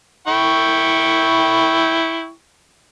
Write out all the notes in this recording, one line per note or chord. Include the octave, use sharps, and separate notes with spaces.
E4 G5 C#6